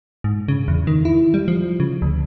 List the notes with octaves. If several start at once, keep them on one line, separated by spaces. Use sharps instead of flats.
G#2
C#3
E2
D#3
E4
G3
F3
C#3
D2